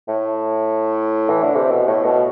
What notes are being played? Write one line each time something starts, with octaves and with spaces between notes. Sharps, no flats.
A2
E3
D3
C3
B2
A2
B2